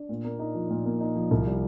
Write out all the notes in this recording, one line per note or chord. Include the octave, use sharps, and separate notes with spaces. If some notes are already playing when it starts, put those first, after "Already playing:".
Already playing: D4
A#2
A#3
D#4
F3
A#2
A#3
D#4
F3
C2
G3